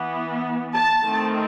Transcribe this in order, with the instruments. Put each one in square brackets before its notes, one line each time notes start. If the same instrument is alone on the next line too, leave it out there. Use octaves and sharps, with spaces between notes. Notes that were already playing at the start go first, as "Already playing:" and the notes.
Already playing: [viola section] E3 B3
A5
D#3 A3 C4